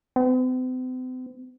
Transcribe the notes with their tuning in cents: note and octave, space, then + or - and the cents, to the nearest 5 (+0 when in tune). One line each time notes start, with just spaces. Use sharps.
C4 -45